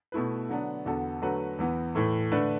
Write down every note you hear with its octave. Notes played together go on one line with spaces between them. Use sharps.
B2 A3 E4 B4
D3 F#3 B3 D4
E2 D3 B3 F#4 A4
D3 F#3 A3 F#4 B4
E2 E3 B3
A2 E3 A3
D3 A3 D4 B4